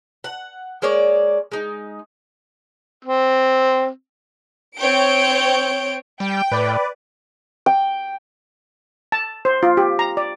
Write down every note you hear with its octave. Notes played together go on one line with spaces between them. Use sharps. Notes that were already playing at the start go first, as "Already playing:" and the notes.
F#5
G#3 A#3 C#5 D5
G#3 D#4
C4
C4 C#5 G5 G6 D7
G3 G5
A2 B4 D5
G5
A5
C5
F4
G4
A#5
D5